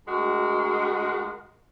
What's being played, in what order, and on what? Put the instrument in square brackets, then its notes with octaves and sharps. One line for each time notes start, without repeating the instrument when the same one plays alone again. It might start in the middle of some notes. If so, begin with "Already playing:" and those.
[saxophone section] D2 G#3 F#4 A#4